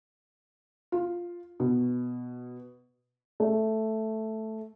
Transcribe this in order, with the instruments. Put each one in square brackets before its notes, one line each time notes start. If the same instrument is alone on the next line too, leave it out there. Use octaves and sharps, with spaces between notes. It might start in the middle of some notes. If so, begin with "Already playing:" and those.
[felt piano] F4
B2
[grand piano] A3